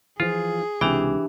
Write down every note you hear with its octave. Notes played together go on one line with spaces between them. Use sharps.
E3 F3 F4 G#4
C#2 C3 E3 D4 G4 E5 G5